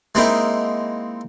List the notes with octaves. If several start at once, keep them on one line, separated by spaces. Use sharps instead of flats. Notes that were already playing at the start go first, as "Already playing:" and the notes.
G#3 A#3 C4 D#4 E4